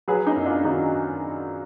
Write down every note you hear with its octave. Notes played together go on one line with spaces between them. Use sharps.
F#3 G#4 B4
B3 D#4
F#2
D4 F4
D#3 D#4 F#4